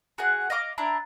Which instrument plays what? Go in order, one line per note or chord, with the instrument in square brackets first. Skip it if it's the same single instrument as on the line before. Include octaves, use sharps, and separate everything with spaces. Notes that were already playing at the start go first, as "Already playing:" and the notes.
[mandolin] F#4 G#4 F#5
D#5 F5 D6
D4 E4 A#5